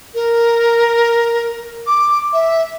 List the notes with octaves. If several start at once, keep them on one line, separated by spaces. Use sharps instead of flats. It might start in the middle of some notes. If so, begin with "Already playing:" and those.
A#4
D6
E5